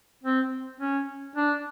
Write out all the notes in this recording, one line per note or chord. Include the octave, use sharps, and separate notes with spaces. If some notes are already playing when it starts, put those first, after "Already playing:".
C4
C#4
D4